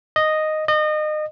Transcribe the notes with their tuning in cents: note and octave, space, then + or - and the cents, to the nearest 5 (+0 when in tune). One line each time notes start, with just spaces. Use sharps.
D#5 -5
D#5 -30